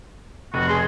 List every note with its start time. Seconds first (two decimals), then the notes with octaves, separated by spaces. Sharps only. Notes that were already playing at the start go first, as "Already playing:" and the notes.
0.54 F1 F#4
0.68 G#4 C6